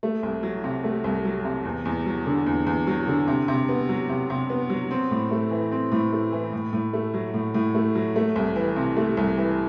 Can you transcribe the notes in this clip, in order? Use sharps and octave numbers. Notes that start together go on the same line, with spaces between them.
A3
C2
F#3
C3
A3
C2
F#3
C3
E2
E2
F#3
D3
E2
E2
F#3
D3
C3
C3
B3
F#3
C3
C3
B3
F#3
C4
A2
A3
E3
C4
A2
A3
E3
A2
A2
A3
F#3
A2
A2
A3
F#3
A3
C2
E3
C3
A3
C2
E3